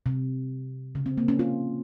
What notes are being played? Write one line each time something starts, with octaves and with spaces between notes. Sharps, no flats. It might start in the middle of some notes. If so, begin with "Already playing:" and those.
C3
C#3
C4
A#3
C#4
F4